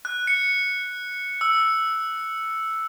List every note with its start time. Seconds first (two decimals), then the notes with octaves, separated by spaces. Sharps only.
0.05 F#6
0.27 C#7
1.41 E6